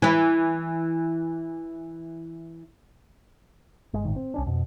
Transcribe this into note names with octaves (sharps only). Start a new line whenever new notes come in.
E3 E4
G1 G#3
G1 A2 D#3
C4
C2 C#4 D4
F2 B2